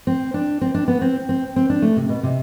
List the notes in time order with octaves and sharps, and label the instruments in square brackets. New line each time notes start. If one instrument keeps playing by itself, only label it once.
[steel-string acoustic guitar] C4
D4
C4
D4
B3
C4
C4
C4
D4
A3
C3
B2
C3